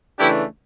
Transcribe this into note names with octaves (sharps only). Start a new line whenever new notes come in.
C#3 E3 A3 D4 E4 G4